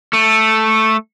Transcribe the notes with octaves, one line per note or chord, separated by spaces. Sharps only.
A3